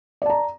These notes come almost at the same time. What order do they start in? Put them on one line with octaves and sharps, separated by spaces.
D5 A5 A#5